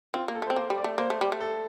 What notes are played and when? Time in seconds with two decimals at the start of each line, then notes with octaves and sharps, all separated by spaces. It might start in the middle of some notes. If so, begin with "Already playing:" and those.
0.14 C4 F4
0.28 A#3
0.35 A4
0.42 A3 C5
0.50 C4
0.56 A#3 C5
0.70 G3
0.78 D5
0.84 A3
0.98 A#3 C5
1.10 A3
1.21 G3
1.32 A3
1.40 A4